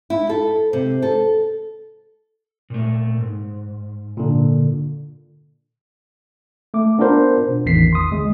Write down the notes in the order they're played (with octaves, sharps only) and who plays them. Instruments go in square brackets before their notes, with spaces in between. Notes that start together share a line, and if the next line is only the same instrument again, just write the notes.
[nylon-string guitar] E4
A4
C3
A4
[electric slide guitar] A#2 A3
G#2
[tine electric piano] A#2 D3
A3 D6
B3 D4 F4 A#4 C5
B2
A1 E2 D#3 B6 C7
C6 D#6
D#2 D3 G#3